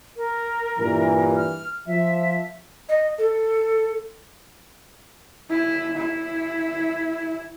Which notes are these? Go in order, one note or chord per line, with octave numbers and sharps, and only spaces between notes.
A#4
G2 A#2 E3
F6
F3 E5
D#5
A4
E4
E4